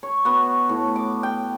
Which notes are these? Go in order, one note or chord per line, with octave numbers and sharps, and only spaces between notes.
C#5
B3 F#4
A2
D6
G5